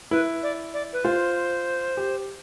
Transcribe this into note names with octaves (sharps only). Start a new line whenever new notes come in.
E4 B4
D5
D5
B4
F4 C5
G4